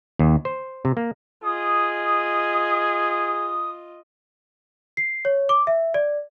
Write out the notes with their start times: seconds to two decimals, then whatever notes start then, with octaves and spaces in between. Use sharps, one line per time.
0.19 D#2
0.45 C5
0.85 C3
0.97 A#3
1.43 F4 G#4 D#5 D#6
4.97 C7
5.25 C#5
5.49 D6
5.67 E5
5.94 D5